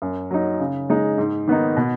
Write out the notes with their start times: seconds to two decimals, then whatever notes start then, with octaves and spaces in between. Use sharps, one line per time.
0.02 F#2
0.31 F#3 D#4
0.60 C#3
0.90 G#3 D#4
1.18 G#2
1.48 D#3 B3 D#4
1.77 B2